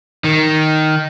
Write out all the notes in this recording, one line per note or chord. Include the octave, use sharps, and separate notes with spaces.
D#3